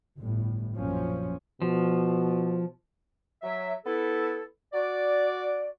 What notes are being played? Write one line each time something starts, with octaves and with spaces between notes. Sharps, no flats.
G1 A2
A#1 F#2 F3 C#4
B2 F3
F#3 E5
B3 E4 A4
F#4 D5